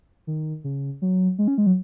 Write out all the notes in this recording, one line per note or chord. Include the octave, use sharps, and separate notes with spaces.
D#3
C#3
F#3
G#3
C#4
G#3
F#3